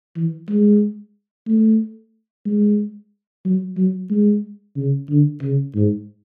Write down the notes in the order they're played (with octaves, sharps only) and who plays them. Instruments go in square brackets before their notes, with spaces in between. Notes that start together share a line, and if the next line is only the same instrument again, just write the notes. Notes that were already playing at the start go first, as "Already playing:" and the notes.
[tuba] E3
G#3
A3
G#3
F#3
F#3
G#3
C#3
D3
C#3
G#2